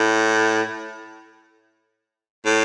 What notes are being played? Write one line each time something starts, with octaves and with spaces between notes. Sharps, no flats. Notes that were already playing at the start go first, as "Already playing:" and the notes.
Already playing: A2
A2